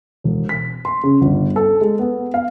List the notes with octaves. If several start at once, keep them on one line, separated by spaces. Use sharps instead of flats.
E1
B6
C6
C#3
G1
A4
G#3
B3
F5